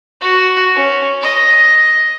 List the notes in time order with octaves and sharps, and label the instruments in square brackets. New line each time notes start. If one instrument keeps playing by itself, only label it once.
[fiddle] F#4
C#4
D#5